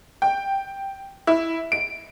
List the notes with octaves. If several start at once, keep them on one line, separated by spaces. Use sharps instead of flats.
G5
E4
D7